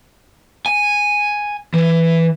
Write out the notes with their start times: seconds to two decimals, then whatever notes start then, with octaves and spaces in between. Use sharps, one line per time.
0.66 G#5
1.74 E3